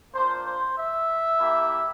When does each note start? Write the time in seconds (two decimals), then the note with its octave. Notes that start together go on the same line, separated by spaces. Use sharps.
0.13 A#3 D4 F4 C5
0.44 C5
0.75 E5
1.40 A#3 E4 G4